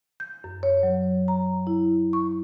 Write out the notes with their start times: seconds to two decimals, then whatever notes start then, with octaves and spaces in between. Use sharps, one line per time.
0.20 G6
0.44 F#2
0.63 C#5
0.83 F#3
1.28 A#5
1.67 E4
2.13 C#6